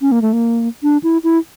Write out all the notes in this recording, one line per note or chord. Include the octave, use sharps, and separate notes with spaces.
C#4
A#3
A3
A#3
D4
E4
E4